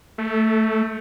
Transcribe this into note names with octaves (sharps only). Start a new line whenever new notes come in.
A3